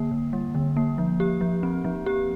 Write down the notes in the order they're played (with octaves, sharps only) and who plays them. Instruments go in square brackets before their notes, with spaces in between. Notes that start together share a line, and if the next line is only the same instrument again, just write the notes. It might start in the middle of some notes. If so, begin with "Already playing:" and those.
Already playing: [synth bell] D3 A#3
D3
G3
D3
A#3
F3
G4
F3
C4
F3
G4